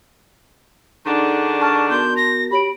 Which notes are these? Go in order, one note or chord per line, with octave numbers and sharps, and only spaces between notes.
D#3 D4 D#4 G#4 A4 F#5
A5 C#6 F6 A6
B3 F#4 A#4 A5 C6 G6
A#6
G4 C#5 B5 D7